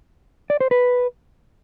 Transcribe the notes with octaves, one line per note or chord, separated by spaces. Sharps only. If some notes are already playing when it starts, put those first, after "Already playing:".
D5
C5
B4